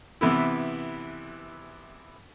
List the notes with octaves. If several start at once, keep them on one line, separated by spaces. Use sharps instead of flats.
C3 E3 B3 E4